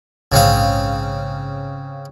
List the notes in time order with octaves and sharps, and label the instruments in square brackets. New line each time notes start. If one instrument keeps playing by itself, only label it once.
[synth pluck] A#1 G#2 [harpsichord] C#3 C4 F5